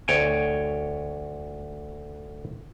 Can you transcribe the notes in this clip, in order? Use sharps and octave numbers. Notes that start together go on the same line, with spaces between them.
D2 C#5 G5 G#5